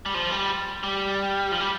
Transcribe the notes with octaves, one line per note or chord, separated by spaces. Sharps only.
G3
F3
G3
G3
F3
G3